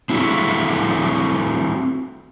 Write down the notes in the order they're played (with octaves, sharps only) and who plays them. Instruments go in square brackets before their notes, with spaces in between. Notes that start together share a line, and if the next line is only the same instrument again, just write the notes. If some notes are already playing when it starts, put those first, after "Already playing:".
[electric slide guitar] C4 E4 F#4